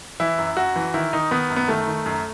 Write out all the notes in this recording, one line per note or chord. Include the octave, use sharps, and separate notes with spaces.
E3 E4
F#2
F#2 F#4
E3
D#3 E4
D#3 D#4
D#3 B3
F#2
B3
D#3 A3
D#3
F#2